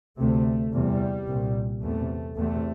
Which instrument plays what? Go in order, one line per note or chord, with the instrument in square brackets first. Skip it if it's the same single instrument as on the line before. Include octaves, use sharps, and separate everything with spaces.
[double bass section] D2 C3 A3
E2 C3 G3
C2 A#2
E2 C3 A3
E2 C3 A3